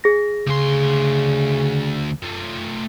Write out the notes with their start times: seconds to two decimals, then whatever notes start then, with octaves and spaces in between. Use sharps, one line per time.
0.04 G#4 A#6
0.47 D2 C#3 C6
2.22 A3 F4